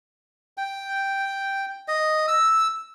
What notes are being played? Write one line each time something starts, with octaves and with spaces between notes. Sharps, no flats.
G5
D#5
E6